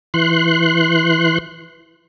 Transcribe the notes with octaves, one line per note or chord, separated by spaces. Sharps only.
E3 C6 F#6